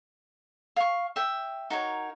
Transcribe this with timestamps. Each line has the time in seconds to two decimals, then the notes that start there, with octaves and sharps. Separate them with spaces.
0.76 F5 C#6
1.16 E5 G5
1.70 D#4 F#4 A#4 C#5